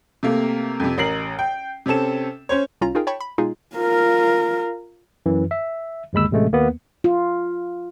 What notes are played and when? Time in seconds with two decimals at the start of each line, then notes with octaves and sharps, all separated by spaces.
0.23 C3 A3 A#3
0.80 F2 C3
0.98 A1 A#4 C7 F#7
1.39 G5
1.86 C3 C4 C#4 A4 E7
2.49 C#4 C5 C#5
2.81 C2 C#4 F4 A#5
2.95 D#4 F4 G#4 A#4 G5
3.07 C#5 G5 A5 B5 C#6
3.20 B5
3.38 B2 G#3 D#4 F4 G#4
3.76 F4 A#4
5.26 F#2 E3
5.51 E5
6.13 G1 D#2 G#3 B5 E6
6.31 A1 C3 G#3 A3
6.52 D#2 A#3 B3
7.04 F4